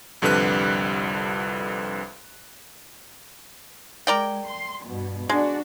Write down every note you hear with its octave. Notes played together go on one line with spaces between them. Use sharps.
C2 F2 D3 G3 B4 F#6
G#3 A#4 D5 G5
C6
G2 B2
G#3 D4 F#4